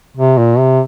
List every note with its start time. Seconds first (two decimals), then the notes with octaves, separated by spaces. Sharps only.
0.17 C3
0.38 A#2
0.59 C3